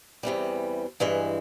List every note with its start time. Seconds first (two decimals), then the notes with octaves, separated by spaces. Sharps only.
0.23 E2 C3 E3 G3
1.00 G2 E3 G#3